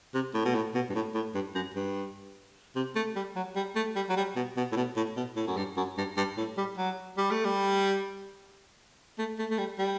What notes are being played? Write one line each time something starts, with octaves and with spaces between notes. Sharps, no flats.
C3
A2
B2
A2
B2
G2
A2
A2
G2
F#2
G2
C3
A3
G3
F#3
G3
A3
G3
F#3
G3
B2
B2
A2
B2
A2
B2
A2
F#2
G2
F#2
G2
G2
A2
G3
F#3
G3
A3
G3
A3
A3
A3
G3
G3